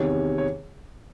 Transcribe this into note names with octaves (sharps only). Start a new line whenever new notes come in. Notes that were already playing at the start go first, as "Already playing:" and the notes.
Already playing: E2 C3 D#3 C#5
C#5